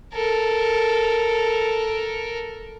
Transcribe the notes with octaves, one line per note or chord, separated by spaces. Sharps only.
A4 A#4